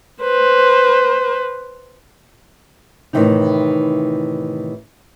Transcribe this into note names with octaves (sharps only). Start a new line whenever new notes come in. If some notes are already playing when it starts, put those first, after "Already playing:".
B4 C5
A2 C3 D#3 E3 C4 D#4